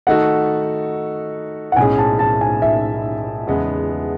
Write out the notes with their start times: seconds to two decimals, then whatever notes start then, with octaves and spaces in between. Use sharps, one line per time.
0.07 D#3 A3 D#4 F#4 A4 F#5
1.72 F#5
1.77 B1 A2 G#3 C#4 G#4 G#5
1.98 A5
2.19 A5
2.41 G#5
2.62 E5
3.47 E2 C#3 G#3 B3